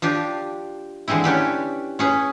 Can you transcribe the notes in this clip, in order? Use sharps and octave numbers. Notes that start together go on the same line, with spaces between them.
F3 D4 G4
D3 E3 G#3 C4 E4
C#4 D4 G4 B4
C#4 G#4 B4